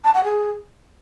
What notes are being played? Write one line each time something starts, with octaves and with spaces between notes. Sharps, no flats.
A5
F#5
G#4